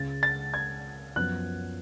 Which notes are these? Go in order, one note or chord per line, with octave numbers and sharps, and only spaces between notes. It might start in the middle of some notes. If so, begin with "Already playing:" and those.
Already playing: C#2 C#3 G#3 A6
A6
G#6
F#2 F3 B3 F#6